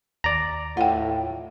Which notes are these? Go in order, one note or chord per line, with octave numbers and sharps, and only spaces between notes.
D#2 D5 A#5
A2 F4 F#5 G5